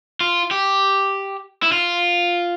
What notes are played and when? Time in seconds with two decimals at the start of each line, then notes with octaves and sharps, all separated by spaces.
0.21 F4
0.51 G4
1.63 E4
1.72 F4